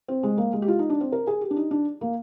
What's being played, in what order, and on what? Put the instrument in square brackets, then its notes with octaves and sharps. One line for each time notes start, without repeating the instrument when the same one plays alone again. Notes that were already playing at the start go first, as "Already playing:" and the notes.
[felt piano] C4
G#3
A#3
G#3
G4
F4
D#4
D4
C4
A#4
G#4
G4
D4
D#4
D4
A#3